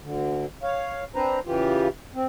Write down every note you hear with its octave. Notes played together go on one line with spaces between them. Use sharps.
D2 D3
C#5 F5
C4 D4 B4 C5 A#5
C#3 E3 F4 G4
C4